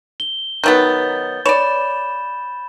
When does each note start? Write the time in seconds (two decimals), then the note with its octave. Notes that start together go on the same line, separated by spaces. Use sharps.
0.20 G7
0.64 D#3 F#3 B3 G6 A6
1.46 C#5 D5 B5 E7